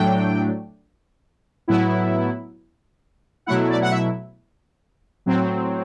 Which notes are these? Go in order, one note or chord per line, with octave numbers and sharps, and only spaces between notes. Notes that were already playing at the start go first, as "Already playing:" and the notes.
Already playing: A2 F#3 A3 D4 G5
A2 F#3 B3 E4
B2 F#3 A3 E4 F#5
D5
F#5
E5
A2 F#3 C4